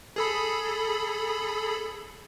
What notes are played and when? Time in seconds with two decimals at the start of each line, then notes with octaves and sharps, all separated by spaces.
0.16 G#4 A4 B5